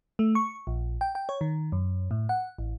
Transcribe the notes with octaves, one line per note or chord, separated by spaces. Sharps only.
A3
C#6
A#1
G5
G5
C#5
D#3
F#2
A2
F#5
A1